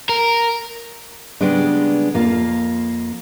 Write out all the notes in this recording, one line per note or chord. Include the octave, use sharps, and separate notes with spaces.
A#4
C#3 G3 G#3 B3 D4
F2 A#3 F4